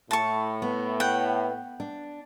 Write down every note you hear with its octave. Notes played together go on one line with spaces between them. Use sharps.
A2 A5 C#6
B3
F#5 G5
D4